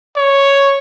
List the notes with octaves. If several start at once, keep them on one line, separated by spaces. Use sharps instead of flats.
C#5